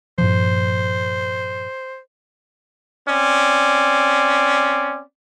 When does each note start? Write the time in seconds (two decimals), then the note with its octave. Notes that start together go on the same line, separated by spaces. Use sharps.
0.18 G2 A#2 F3 C5
3.08 C4 C#4 D5